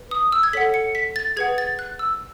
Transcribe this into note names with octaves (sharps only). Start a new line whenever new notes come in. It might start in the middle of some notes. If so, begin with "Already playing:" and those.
Already playing: B4
D#6
E6
G#6
A4 C#5 F#5 B6
C#7
B6
A6
G#4 B4 F#5 G#6
A6
F#6
E6